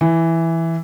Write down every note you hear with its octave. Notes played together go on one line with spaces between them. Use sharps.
E3